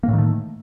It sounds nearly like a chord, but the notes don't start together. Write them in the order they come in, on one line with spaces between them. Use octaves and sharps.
A#3 A2 D#3 A3